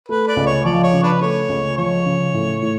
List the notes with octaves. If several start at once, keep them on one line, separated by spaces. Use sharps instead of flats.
A3 B4
B4 D5
C#2
C#5
F3 D5
C#5
C#3
D4 B4
A3 C#5
C#2
F3 C#5
C#3
A2
A2